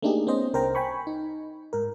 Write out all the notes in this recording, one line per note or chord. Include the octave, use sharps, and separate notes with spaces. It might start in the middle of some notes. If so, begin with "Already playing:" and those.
A3 A#3 D4 D#4 G4 G#4
B3 C#4 C5 D#5
C2 A#4 C5 G5 A#5
G5 G#5 B5 C#6
D#4
G#2 A#4